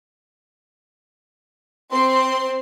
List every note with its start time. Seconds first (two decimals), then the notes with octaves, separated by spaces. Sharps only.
1.92 C4 C6